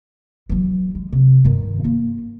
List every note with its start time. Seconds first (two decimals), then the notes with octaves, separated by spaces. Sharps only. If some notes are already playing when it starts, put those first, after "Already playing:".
0.49 E3 F#3
0.95 G#3
1.12 C3
1.45 G2 D#3
1.84 A#3 F4